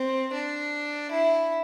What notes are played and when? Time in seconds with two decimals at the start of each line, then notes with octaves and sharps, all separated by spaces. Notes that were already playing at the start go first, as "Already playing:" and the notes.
Already playing: C4
0.32 D4
1.11 E4